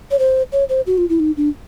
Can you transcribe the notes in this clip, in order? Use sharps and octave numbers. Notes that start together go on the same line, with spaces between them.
C#5
C5
C#5
C5
F#4
F4
E4
D#4
D4